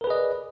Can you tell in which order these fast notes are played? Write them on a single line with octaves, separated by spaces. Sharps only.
A#4 B4 G#4 D#5 D5